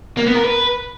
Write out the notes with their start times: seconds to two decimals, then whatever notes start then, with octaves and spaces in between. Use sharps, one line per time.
0.17 A#3
0.26 B3
0.35 A#4
0.45 B4